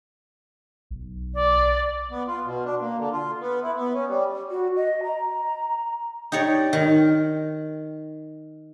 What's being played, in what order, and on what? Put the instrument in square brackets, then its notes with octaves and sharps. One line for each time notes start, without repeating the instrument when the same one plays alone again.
[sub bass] B1
[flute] D5
[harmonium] B3
F4
B2
D4
A#3
D3
F4
B3
E4
B3
C#4
G3
[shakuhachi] F#4
D#5
A#5
[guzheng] D#4 G4 C#5 D5
D#3